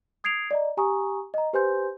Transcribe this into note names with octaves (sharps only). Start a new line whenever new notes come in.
D#6 G#6 C7 D7 F7
D5 D#5 A#5
G4 G#5 A#5 C#6 D#6
D#5 A#5
G4 B4 C5 G#5 C6 G6